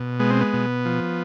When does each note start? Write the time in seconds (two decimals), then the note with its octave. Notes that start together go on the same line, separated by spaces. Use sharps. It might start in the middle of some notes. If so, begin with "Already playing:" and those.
Already playing: B2
0.20 G#3 B3
0.30 C4
0.41 B3
0.53 B2
0.85 F3